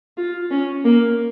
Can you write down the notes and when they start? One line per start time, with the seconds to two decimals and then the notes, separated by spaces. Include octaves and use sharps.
0.17 F4
0.50 C#4
0.85 A#3